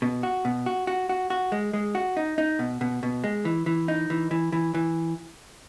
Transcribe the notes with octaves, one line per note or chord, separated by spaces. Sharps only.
B2
F#4
B2
F#4
F#4
F#4
F#4
G#3
G#3
F#4
D#4
D#4
B2
B2
B2
G#3
E3
E3
D#4
E3
E3
E3
E3